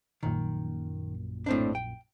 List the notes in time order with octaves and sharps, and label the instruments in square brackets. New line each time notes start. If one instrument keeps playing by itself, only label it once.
[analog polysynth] A#1 F#2 A#2 [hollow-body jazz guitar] D#3
[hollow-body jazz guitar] A2 C4 D4
G5